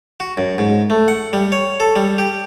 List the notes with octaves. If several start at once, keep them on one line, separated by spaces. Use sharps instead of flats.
F#4
F#2
G#2
A3
F#5
G3
C#5
A4
G3
G4